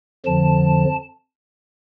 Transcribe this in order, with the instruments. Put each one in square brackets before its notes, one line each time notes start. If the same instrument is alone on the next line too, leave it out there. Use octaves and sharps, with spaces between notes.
[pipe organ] F2 D3 F3 A5